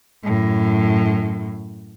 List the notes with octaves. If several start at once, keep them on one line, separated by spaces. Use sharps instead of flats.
F#2 A2